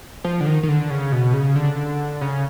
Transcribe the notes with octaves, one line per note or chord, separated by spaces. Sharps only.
F3
D3
D#3
D#3
D3
C#3
B2
C#3
D3
C#3